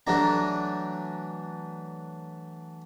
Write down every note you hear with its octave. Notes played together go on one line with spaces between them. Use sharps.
E3 F#3 A3 D4 A#5